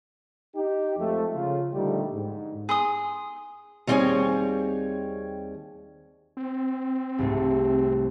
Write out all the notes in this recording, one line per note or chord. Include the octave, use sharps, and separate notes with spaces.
D#4 G4
F2 F3 G#3 A3
C#3 F4
A#1 D3 G3 A3 D#4 G4
G#2
G#4 C6 D#6
D#2 G3 C4 G#4 C#5 G#5
C4
C2 G#2 A3